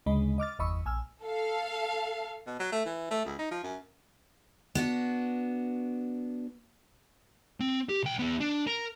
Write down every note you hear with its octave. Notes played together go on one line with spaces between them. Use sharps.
D2 C#3 G#3 D#5 B5
D#5 D6 F6 A6
G1 E2 D#5 B5 C#6 E6
A#1 G#5 E6 F6
A4 F5
B2
F#3
A3
E3
A3
C#2
D#4
F3
F#2
B3 D4 F#4
C4
G4
B1 G5
E2 B3
D4
A#4